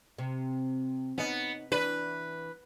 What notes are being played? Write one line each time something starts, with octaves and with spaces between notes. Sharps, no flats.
C3
B3 C#4 D#4
E3 D4 B4